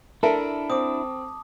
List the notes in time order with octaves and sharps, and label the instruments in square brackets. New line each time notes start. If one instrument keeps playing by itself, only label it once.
[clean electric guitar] D4 E4 [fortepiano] A4 A#4 E5 [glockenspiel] A5
[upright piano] C4 [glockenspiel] D6 D#6